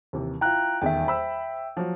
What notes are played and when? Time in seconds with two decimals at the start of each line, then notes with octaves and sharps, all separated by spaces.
0.13 D#2 C3 E3
0.41 E4 F4 G5 A#5 F#6
0.82 D#1 E2 D#3 E5 G5
1.07 C5 B5 E6
1.77 F3 F#3 F#4